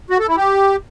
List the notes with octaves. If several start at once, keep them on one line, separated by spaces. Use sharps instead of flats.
F#4
A4
E4
G4